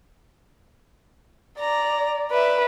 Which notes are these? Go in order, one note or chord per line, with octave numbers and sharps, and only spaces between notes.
D5 A#5
B4 D5 E5